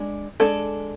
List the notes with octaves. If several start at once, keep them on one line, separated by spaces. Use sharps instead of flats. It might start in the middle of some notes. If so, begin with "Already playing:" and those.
Already playing: G#3 D4
G#3 D4 A4